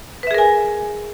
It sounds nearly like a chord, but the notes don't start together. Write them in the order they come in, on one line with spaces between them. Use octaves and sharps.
B4 E5 G#4 A#4 G#5